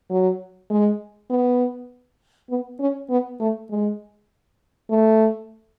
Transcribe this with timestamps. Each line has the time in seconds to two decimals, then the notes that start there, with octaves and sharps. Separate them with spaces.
0.10 F#3
0.70 G#3
1.30 B3
2.50 B3
2.80 C#4
3.10 B3
3.40 A3
3.70 G#3
4.90 A3